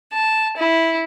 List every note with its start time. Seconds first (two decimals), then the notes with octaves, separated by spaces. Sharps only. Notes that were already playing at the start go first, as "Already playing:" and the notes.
0.14 A5
0.59 E4